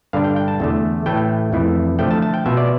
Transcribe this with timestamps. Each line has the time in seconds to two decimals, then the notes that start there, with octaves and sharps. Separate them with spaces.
0.13 G2 D3 G3 D4 F5
0.24 G5
0.36 G5
0.48 A5
0.60 E2 D3 A3
1.06 A2 E3 A3 G5
1.53 F2 E3 A3 E4
1.99 D3 F3 A3 G5
2.11 A5
2.22 A5
2.34 G5
2.46 B2 B3 F4 E5
2.57 D5